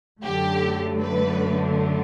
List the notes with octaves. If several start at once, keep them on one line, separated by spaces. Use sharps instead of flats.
F#2 D3 A3 G4
B4